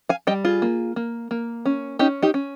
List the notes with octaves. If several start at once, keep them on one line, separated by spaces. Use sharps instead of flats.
F5 G#5
G3 D#5 G5
F4 G#4
A#3
A#3
A#3
C#4
C#4 D#4 G4
D#4 G4
C#4